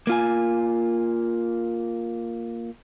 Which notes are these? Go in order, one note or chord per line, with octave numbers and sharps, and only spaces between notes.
A#3 F4 G#5